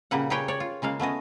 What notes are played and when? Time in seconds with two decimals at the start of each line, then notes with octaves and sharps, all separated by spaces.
0.11 A#2 C#3 G3 A#3 B4 F#5
0.30 G4 G#4 A#4 B4 C#5 G5
0.48 C#5 D5
0.60 F4
0.82 C#3 G#3 A#3 F5
1.00 A3 B3 C#4 D#5